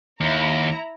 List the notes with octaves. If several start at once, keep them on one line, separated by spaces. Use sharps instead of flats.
D#2 E4 A#5